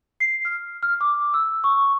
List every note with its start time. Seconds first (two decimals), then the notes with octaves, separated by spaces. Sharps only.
0.20 C7
0.45 F6
0.83 F6
1.01 D6
1.34 E6
1.64 C#6